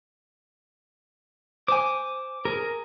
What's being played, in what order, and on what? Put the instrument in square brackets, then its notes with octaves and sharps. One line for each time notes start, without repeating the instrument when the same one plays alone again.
[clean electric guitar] C5 G#5 [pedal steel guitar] D6
[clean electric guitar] G#4 [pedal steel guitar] A#4